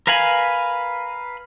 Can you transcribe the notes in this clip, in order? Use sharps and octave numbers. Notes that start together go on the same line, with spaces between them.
A#4 B4 F5 G#5 B5